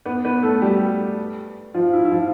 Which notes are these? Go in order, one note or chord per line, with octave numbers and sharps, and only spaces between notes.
B3 B4
B3 B4
A3 A4
G3 G4
F3 F4
E4
E4
F3 F4